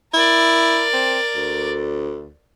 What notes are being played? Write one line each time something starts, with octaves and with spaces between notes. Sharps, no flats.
E4 A#4 D5
C4
D2